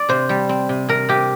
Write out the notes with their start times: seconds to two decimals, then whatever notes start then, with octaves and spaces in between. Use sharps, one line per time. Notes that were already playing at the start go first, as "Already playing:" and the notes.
Already playing: D5
0.09 C3 C5
0.29 G3
0.49 C4
0.69 C3
0.89 C3 A#4
1.09 C3 G4